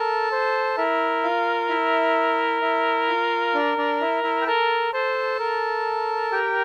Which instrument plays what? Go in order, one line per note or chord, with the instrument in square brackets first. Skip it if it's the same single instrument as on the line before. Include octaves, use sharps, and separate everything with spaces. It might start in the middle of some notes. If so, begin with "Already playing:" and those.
Already playing: [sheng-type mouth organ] A4 A5 [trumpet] A#4
[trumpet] C5
[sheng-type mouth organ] E4 E5 [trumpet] A#4
[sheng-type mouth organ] F4 F5
E4 E5
E4 E5
F4 F5
D4 D5
D4 D5
E4 E5
E4 E5
G5
[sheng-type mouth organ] A4 A5 [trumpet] A#4
[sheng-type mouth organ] A4 A5 [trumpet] C5
[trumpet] A#4
[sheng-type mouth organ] G4 G5